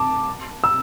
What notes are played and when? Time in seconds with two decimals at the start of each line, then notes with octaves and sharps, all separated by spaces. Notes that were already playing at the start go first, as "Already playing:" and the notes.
Already playing: A5 D6
0.64 E6